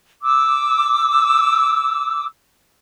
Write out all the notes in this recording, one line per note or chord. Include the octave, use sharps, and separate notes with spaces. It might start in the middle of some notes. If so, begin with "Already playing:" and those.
D6 E6